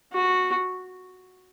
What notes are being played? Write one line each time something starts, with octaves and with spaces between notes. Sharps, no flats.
F#4